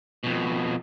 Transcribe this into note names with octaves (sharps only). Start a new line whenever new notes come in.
F2 B2